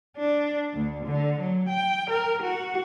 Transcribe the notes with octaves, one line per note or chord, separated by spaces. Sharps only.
D4
D2
D3
F#3
G5
A#4
F#4